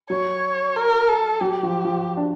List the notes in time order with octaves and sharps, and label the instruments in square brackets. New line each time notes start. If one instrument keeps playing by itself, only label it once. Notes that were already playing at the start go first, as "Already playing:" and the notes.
[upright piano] F#3 [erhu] C#5
[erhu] A#4
A4
[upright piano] F#3 [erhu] G4
[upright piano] F3
F3
D4